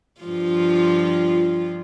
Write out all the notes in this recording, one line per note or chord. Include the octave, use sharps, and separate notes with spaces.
G2 F3 F4